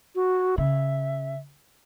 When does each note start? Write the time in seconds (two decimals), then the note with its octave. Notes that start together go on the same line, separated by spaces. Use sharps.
0.15 F#4
0.58 C#3 E5